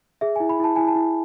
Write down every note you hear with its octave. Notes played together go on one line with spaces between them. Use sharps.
G#4 E5
E4 G#5
B5
E4 A5
E4 G#5
A5
E4